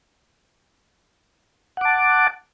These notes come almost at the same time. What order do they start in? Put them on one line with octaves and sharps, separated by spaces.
F#5 D6 A5